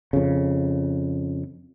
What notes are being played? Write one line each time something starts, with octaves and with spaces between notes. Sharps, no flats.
F2 C#3